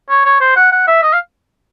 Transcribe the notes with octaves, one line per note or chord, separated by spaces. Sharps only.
C#5
C#5
C5
F#5
F#5
E5
D#5
F5